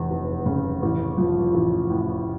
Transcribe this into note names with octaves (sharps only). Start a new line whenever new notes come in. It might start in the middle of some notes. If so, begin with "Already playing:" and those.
Already playing: F1 E2
F1
C#3
A1
F3
A1
A2